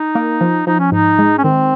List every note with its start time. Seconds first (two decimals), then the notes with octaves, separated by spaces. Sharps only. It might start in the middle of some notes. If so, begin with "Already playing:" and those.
Already playing: D#4
0.15 A#3
0.41 F3
0.67 F3 D#4
0.79 C#4
0.92 G#2 D#4
1.19 G#3
1.38 C#4
1.44 D#3 C4